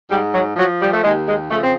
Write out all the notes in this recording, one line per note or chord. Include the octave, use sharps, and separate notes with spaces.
G#2 G3
F#3
F3 F#3
G3
A3
D#2 G#3
G#3
C#3 F3 A3
C4